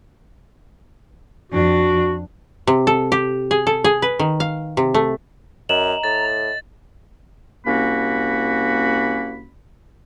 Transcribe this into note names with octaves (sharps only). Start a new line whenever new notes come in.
F2 D4 F#4
C3
A4
G4
G#4
A4
G#4
B4
D#3
F5
C3
A3
F#2 D#5 A#5 E7 F#7
A2 A6
C2 A#3 C#4 F#4 B5